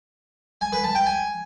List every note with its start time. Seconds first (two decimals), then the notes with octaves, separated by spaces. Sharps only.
0.61 G#5
0.73 B4
0.84 A5
0.95 G5
1.06 G#5